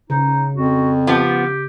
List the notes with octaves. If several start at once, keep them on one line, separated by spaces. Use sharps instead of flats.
C#3 D#4
F2 F#4
F3 B3 G4